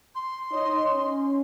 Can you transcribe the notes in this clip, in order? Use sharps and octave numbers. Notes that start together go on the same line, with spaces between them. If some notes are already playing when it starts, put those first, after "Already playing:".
C6
D#4 C#5 D#5
C#4